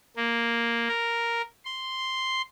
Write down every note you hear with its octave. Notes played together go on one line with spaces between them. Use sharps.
A#3
A#4
C6